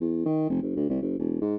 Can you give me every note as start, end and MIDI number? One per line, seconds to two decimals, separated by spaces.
0.01 0.25 40
0.26 0.45 51
0.50 0.62 29
0.62 0.73 30
0.76 0.88 38
0.90 0.98 36
1.02 1.15 30
1.18 1.37 28
1.41 1.56 44